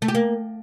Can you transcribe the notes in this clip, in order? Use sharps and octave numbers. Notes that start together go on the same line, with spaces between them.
A3
G4
A#3